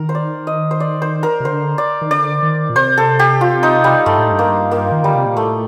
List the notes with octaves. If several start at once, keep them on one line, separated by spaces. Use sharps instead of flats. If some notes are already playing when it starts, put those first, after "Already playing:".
Already playing: D#3 A#4
C5
D5
D#5
C5
D5
C5
A#4
C3
D3 C5
D5
D#3
D3 D5
D#3
A#2
C3 C5
A4
G4
F4
D#4
G3
G2 A3
A2
G2
A#3
A#3
D#3
D3 G3
C3
A#2
A2 A3